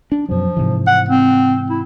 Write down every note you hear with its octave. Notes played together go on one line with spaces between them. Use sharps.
D4
F#2 B2 F3 F#3
G#2 C3 E3
F#5
C4
E4